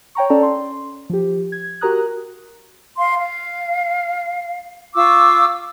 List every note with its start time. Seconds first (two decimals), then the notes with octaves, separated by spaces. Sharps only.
0.15 C#5 G5 A#5 C#6
0.30 C#4 A4 D5 G5 A5 A#5
0.43 C6
1.10 F3 G4
1.52 G#6
1.81 F#4 G4 A#4 A#5 D#6 F#6
2.98 F5 C6
3.18 F5
4.95 F4 C#6 D6 E6